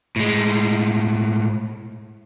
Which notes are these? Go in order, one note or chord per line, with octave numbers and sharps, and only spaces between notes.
A2 G#3